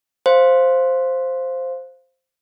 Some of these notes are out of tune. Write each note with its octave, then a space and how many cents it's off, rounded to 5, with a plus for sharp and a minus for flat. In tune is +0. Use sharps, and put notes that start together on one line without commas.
C5 +0 F5 +0